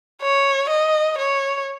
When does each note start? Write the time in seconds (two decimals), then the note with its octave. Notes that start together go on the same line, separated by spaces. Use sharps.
0.21 C#5
0.69 D#5
1.18 C#5